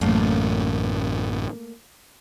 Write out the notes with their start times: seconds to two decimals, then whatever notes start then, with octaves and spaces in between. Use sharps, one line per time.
0.01 A1 F#2 A3 A#3